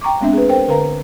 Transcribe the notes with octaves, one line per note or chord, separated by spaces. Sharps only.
G5 A#5 C#6 D6
G#3 B3 C4 D4 E5
G#4 B4
A#4 C5 G5
D3 A#4 B4 F5 A#5